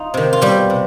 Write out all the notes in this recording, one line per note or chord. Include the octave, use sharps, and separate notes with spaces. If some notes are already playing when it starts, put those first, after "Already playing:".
Already playing: D#4 F4
C3 D#3
F4
B2 G3 G4
C3